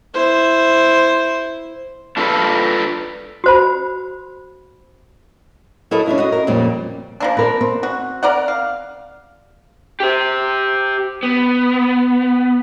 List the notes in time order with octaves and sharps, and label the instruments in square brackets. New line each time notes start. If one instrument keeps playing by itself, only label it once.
[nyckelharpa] E4 C5
[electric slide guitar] D4 F4 A4 B4
[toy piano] F#4 C5 B5
[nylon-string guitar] F#3 E4 F#4 A4 A#4 D#5
C#4 D4 E4 A#4
F#4 D#5
A#4
F2 A#2 C#3 G3 A#3
[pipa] F3 A#3 D4
[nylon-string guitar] C4 A#4 [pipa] D4 B4
[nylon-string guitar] C4
[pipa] F#4
A#4 D5 F#5
F5
[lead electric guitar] G4 C5
B3